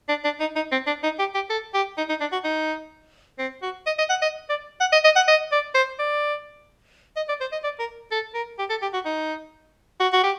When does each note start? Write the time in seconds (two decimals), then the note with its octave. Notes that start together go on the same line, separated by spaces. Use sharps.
0.09 D4
0.24 D4
0.40 D#4
0.56 D#4
0.72 C4
0.87 D4
1.03 D#4
1.19 G4
1.35 G4
1.50 A4
1.74 G4
1.98 D#4
2.09 D#4
2.21 D4
2.32 F#4
2.44 D#4
3.39 C4
3.62 F#4
3.86 D#5
3.98 D#5
4.10 F#5
4.22 D#5
4.50 D5
4.80 F#5
4.92 D#5
5.05 D#5
5.16 F#5
5.28 D#5
5.52 D5
5.75 C5
5.99 D5
7.17 D#5
7.29 D5
7.41 C5
7.52 D#5
7.64 D5
7.80 A#4
8.12 A4
8.34 A#4
8.59 G4
8.70 A4
8.82 G4
8.94 F#4
9.05 D#4
10.00 F#4
10.13 F#4
10.24 G4